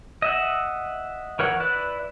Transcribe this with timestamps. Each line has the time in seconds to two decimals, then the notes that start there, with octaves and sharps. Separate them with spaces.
0.22 D#5 E5 F#5
1.39 E3 A#4 C#5 F#5
1.60 E4 B4 D5 F#6